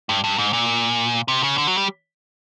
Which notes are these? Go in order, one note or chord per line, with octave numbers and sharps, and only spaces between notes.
G2
G2
G#2
A#2
C3
C#3
D3
F#3
G3